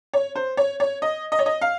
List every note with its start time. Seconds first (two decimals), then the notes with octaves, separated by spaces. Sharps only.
0.13 C#5
0.35 C5
0.57 C#5
0.80 C#5
1.02 D#5
1.32 D#5
1.39 C#5
1.46 D#5
1.61 F5